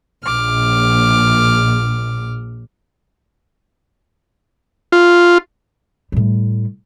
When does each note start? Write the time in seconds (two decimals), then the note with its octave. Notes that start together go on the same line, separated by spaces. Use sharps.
0.23 A#1 D6 F6
4.92 F4
6.12 A2 G3